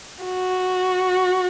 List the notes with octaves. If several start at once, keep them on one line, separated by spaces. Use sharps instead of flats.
F#4